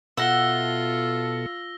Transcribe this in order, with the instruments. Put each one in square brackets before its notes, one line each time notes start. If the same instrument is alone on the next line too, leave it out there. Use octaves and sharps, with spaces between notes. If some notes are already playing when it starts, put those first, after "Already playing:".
[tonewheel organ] B2 A4 [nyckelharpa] F4 [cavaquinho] E5 F#5 [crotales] E6 A#6 G7